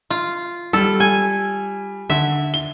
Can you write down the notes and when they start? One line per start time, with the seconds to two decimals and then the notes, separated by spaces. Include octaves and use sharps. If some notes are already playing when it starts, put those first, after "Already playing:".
0.10 F4
0.73 G3 A4
1.00 G#5
2.10 D3 E5
2.54 G7